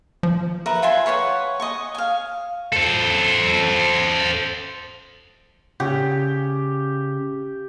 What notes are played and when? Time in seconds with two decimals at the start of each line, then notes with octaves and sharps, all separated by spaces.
0.23 F3
0.66 A#4 B4 E5 F#5
0.82 F4 E5 G#5 C6
1.06 B4 C#5 F#5 G#5
1.60 D#5 G#5 C#6
1.95 F5 G#5
2.73 A4 C5
5.80 C#3 G4